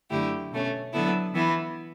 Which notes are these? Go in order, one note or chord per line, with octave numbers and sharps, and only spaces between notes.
F#2 D3 A3 E4 G4
B2 A3 C#4
D3 F#3 B3 E4 A4
E3 B3 E4